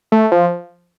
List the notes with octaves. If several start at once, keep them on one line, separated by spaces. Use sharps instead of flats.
A3
F3